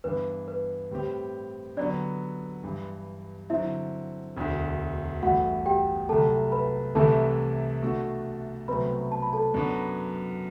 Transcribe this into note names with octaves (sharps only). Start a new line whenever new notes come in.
G2 E3 B3 D4 B4
B4
A2 G3 C4 G4
D3 F#3 B3 D4 D5
G2 E3 G3
D3 F#3 C4 E4 E5
E1 D2 D3
A1 G2 E3 A3 F#4 F#5
G4 G5
C2 C3 F#3 A3 A4 A5
B4 B5
C2 C3 E3 A3 E4 A4 A5
B2 A3 D4 F#4 A4
C2 B2 F#3 A3 C4 B4 B5
A5
B5
A4 A5
F#2 F#3 B3 D4